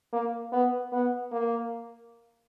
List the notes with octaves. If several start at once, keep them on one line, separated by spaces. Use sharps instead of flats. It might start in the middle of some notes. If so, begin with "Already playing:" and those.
A#3
B3
B3
A#3